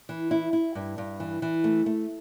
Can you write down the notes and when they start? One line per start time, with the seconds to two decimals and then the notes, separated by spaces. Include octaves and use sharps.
0.09 E3
0.31 E4
0.53 E4
0.75 G2
0.98 G2
1.20 E3
1.42 E3
1.64 A3
1.86 A3